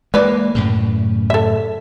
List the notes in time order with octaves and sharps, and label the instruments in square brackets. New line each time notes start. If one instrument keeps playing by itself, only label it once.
[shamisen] E3 B4 D5 [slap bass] G#3 A#3
[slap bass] F#2 A2 C#3
[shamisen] A4 E5